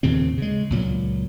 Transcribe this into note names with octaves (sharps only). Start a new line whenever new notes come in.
D#2 A#2 C#3 C4
C#3 G#3
C#2 A#2 F#3